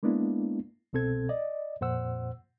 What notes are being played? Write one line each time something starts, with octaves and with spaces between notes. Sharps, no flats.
G#3 A#3 B3 D4 E4
C2 B2 C4 A4 G#6
D5 D#5
F2 A#2 C5 F#5 E6